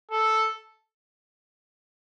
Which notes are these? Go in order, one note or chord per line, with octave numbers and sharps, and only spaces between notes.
A4